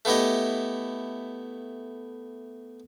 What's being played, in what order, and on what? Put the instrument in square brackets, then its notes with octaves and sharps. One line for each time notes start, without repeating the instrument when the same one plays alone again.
[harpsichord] A3 B3 E4 G4 D#5